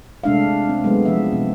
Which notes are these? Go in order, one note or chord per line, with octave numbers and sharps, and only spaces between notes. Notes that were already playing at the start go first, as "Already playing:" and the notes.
C3 G#3 A3 D4 E5 F5
C4
F#3 G#3 A3 B3
F3 G#3 C4 E5
C3 C4